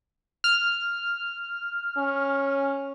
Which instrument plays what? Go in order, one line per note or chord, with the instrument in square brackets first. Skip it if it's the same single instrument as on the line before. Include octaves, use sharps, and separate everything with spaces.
[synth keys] F6
[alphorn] C#4